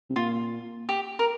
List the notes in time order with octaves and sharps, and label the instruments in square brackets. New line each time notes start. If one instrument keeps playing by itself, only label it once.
[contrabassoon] C3
[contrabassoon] A#2 [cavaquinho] F4
[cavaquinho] G4
A#4